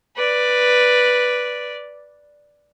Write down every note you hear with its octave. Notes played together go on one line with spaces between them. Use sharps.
B4 D5